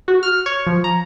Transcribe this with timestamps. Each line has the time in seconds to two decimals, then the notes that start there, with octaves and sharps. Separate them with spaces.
0.08 F#4
0.23 F6
0.46 C#5
0.67 F3
0.84 A#5